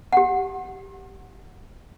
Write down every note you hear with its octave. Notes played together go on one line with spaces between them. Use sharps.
G4 F#5